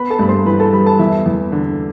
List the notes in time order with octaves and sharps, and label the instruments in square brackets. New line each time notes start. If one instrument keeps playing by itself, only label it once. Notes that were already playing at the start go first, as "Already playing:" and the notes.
Already playing: [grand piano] B3 B4 B5
A4 A5
G2 B5
C5 C6
E3 B4 B5
A4 A5
G3 B4 B5
A4 A5
E2 E4 E5
E2
D3